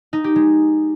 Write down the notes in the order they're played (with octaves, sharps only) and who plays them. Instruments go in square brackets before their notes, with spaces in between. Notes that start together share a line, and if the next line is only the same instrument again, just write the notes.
[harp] D#4
G4
G#3